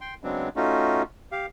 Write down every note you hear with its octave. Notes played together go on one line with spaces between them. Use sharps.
G5 C6
C#3 F#3 G#3 B3 C4 D4
A3 C#4 D#4 F4 F#4
G4 F5